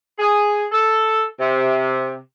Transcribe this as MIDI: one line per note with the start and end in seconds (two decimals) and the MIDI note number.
0.19 0.65 68
0.72 1.22 69
1.39 2.19 48